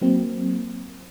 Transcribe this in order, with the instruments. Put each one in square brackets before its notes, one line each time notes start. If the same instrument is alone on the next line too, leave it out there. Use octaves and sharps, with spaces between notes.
[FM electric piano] F#3 A#3 C4